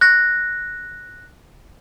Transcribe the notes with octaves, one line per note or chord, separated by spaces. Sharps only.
F#6 A#6